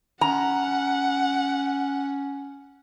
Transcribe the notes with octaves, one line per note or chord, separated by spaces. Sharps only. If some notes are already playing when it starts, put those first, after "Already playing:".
C#4 F#5 A#5